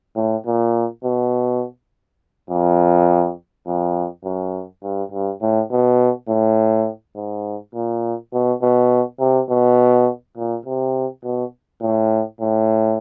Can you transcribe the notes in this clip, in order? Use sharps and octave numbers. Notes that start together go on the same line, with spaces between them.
A2
A#2
B2
F2
F2
F#2
G2
G2
A2
B2
A2
G#2
A#2
B2
B2
C3
B2
A#2
C3
B2
A2
A2